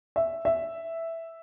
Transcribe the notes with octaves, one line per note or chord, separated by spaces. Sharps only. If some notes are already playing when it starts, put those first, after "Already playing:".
E5
E5